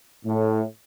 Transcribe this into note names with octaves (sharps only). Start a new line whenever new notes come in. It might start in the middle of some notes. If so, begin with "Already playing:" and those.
A2